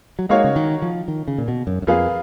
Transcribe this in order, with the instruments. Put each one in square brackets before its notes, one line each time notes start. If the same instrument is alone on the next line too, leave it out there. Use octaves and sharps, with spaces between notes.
[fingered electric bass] F#3
[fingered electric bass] G#3 [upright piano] A#3 D#4 F#4 C#5 F5
[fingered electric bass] C#3
D#3
F3
D#3
C#3
A#2
B2
F#2
F#2
[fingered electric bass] F2 [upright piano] A#3 F4 G#4 B4 F5